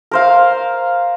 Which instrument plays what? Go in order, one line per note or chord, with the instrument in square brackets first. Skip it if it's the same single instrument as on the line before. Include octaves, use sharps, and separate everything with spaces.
[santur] A#4 C5 F5